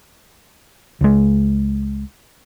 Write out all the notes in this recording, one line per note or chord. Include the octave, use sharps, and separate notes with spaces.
C#2 G#3